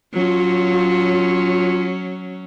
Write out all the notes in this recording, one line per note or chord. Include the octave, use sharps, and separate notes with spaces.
F#3 C#4 F4